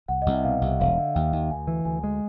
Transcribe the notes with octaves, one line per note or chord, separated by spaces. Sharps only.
C2 F#5
C2 D#5
E5
B2 F5
C2
E5
E1 F5
D3
D#2 G5
D#2
D2 G#5
E3
D2 G#5
G#3